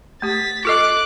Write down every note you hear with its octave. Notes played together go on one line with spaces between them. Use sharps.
A3 G4 A6 B6
F4 A4 D#5 D6 F#6